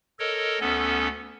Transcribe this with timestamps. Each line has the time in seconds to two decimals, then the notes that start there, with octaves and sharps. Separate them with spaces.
0.19 A4 A#4 C#5 D#5
0.61 D2 B3 C#4 A4